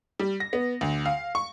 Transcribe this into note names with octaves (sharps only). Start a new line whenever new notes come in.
G3
A#6
B3
D2
F5
C#6